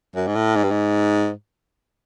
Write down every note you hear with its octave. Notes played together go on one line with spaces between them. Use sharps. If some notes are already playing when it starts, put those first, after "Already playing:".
F#2
G#2
A2
G#2
G2
G#2